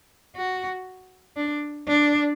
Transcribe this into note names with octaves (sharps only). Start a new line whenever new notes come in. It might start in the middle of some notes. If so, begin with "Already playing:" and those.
F#4
D4
D4